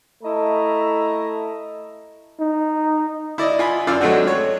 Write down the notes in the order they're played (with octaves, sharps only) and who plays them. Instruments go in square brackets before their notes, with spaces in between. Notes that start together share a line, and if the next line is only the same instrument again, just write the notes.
[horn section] A3 E4 D#5 A#5
[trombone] D#4
[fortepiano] E4 D5 D#5
F4 G#5 B5
F#2 F4 D5 E6 F6
F#3 G#3 A3 C4 D4 F#4
C#5